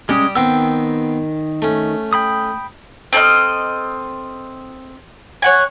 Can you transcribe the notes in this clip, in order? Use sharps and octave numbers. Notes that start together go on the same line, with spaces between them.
G3 G#3 C#4 G4 D#6
D#3 B3 C4 G5 E6
A3 C#4
G5 B5 D#6
C4 A4 D#5 F6
C#5 F#5 G#5